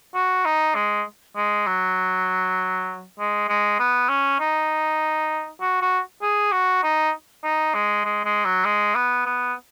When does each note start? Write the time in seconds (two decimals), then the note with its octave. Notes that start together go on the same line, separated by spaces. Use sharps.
0.15 F#4
0.45 D#4
0.75 G#3
1.36 G#3
1.67 F#3
3.19 G#3
3.48 G#3
3.79 B3
4.09 C#4
4.40 D#4
5.61 F#4
5.81 F#4
6.22 G#4
6.52 F#4
6.83 D#4
7.43 D#4
7.74 G#3
8.05 G#3
8.25 G#3
8.45 F#3
8.65 G#3
8.95 B3
9.26 B3